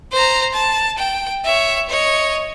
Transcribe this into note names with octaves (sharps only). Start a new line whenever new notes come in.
C5 A#5
A5
G5
C#5 E5
C#5 D#5